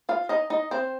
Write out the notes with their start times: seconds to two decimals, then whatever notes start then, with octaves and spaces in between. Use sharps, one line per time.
0.09 F4 F5
0.29 D#4 D#5
0.50 D#4 D#5
0.71 C4 C5